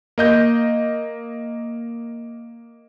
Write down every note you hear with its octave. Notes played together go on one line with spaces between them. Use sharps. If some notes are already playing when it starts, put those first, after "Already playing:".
A#3 D#5 G6